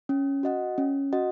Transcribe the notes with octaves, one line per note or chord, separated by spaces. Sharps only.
C#4
F#4 D#5 F#5
C#4
F#4 D#5 F#5